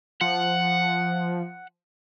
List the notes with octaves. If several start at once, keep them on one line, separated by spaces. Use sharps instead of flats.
F3 F#5